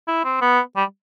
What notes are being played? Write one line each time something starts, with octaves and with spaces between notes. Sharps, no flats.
E4
C4
B3
G3